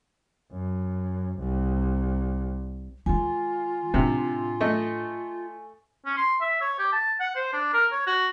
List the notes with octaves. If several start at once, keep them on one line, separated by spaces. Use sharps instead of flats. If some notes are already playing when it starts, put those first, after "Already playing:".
F#2
C2
D#3 G#3 F4 G#5
A2 C3 D4
A3 D#5
C#4
C6
E5
C#5
G4
A5
F#5
C5
D4
A#4
C#5
F#4